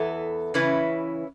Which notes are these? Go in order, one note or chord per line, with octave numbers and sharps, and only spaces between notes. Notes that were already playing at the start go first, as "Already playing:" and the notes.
Already playing: E2 E3 B3 A4
C#3 E3 C#4 E4 B4